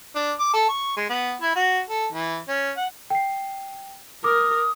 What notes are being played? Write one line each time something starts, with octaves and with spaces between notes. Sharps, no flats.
D4
D6
A4
C#6
G#3
B3
E4
F#4
A4
E3
C#4
F#5
G5 C7
A#4 D6 D#6